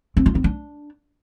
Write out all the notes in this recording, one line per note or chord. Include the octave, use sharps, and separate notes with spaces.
C4
F4
C4
D4